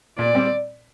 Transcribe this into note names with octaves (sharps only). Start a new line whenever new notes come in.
A#2 D5
G3 C4